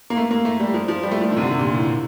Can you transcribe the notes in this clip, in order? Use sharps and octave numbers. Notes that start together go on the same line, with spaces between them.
A#3
A3
A#3
A3
G3
F3
F3
G3
A3
F3
D#3
C3
D3
C3
A#2
A2